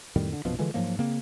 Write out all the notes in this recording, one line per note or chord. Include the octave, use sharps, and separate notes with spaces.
F2 A2 D#3 G3
D3
A#1 F#2 B2 F3
D3 E3 F3 G#3
G#2 F3 F#3 A#3
C#3 A#3 C4